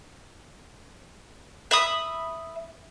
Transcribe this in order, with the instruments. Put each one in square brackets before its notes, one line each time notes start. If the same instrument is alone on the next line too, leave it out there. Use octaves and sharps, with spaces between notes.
[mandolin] E5 B5 D#6